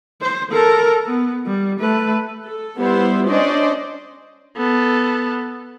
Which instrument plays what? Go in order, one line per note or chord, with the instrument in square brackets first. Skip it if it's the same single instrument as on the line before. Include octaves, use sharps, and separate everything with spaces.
[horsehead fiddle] C5
A4 A#4
B3
G3
A3 B4
[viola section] A4
G3 B3 E4 C5
C#4 D4 C5 D5 D#5
[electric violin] B3 A4